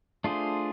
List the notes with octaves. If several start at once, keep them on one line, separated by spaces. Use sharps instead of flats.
A3 D4 F4 G#4 C5